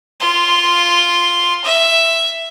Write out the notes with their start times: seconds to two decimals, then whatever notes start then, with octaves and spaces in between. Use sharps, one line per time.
0.20 F4 C6
1.65 E5